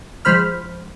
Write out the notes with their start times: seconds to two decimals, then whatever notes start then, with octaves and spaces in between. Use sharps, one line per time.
0.25 F3 G#3 C5 B5 F6